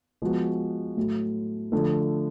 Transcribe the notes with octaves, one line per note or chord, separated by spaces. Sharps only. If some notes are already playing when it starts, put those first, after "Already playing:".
F3 G#3 B3 F#4
A2 F#3 A3
D3 F3 A3